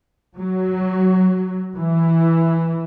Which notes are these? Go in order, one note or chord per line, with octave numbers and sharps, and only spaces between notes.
F#3
E3